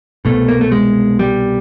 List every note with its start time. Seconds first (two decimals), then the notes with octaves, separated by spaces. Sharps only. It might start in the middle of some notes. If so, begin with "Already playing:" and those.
0.25 C2 B2 A3
0.48 A#3
0.61 A3
0.72 G#3
1.19 G3